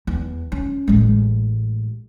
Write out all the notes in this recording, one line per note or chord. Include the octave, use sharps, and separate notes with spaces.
E2
C#4
A1 G#3